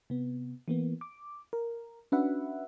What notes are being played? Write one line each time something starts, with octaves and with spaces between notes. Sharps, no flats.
C3 B3
E3 A#3 B3
D6
A#4
C#4 D4 F#4 B4 E5 F#5